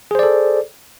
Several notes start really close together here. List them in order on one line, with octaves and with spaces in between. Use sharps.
G#4 C5 D5 A4